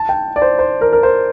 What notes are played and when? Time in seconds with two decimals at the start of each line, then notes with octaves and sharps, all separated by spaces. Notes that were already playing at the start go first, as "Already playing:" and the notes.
Already playing: A5
0.09 G5
0.36 D5
0.42 C5
0.59 C5
0.81 A#4
0.93 A#4
1.03 C5